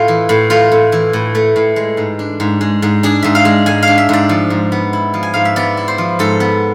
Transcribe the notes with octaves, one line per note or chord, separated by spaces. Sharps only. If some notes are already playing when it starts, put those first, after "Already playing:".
Already playing: A2 A3 F4
E3
A2
A3 F4
A2
E3
A2
A3
A2
G#3
G#2
D4
G#2
G#3
G#2
D4 G#4
G#2 E5
F5
G#3
G#2 G#5
D4 F5
E5
G#2 D5
F3
G#2
B3
E4
F3
G#5
G#2 F5
E5
B3 D5
E4
C5
F3
G#2 A4
B3